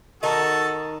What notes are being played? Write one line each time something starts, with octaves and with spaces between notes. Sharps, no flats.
D#3 D#4 F#4 A4 A#4 A5